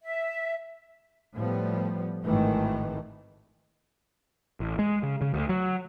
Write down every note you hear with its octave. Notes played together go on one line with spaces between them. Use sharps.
E5
A2 F3 G3 A3 B3
G#1 A2 D#3 E3 A3
A1
G#3
C#3
C#3
D2
F#3